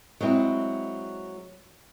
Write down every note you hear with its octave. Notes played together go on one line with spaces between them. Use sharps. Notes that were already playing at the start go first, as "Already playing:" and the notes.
F#3 G#3 C4 E4